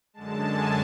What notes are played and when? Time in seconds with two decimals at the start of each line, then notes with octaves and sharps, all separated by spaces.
0.13 F#2 D3 G#3 A5
0.49 G#5